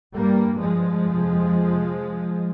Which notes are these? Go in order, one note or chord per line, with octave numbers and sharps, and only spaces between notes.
G2 G3 A#3
F3 G#3
F2 C3